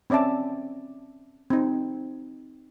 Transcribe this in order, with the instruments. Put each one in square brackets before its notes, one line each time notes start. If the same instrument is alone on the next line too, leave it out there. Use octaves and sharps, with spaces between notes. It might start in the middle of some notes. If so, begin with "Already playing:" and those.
[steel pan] C4 C#4 D5 E5 A5
C4 D#4